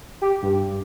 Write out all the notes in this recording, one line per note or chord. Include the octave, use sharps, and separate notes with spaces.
G4
G2